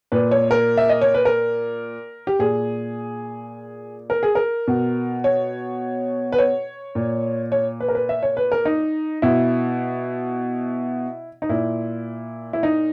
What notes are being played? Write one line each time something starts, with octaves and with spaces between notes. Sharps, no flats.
A#2 B4
C#5
A#4
E5
D#5
C#5
B4
A#4
G4
A#2 G#4
A#4
G#4
A#4
B2
C#5
B4
C#5
A#2
C#5
B4
A#4
B4
E5
C#5
B4
A#4
D#4
B2 E4
D#4
A#2 E4
E4
D#4